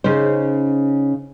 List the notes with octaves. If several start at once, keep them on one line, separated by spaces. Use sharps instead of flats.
C#3 C#4 D#4 C5